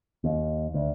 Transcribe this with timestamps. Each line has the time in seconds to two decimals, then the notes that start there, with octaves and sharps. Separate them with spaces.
0.24 D#2
0.74 D2